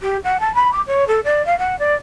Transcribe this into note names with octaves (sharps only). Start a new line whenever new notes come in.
G4
F#5
A5
B5
D6
C#5
A4
D5
F5
F#5
D5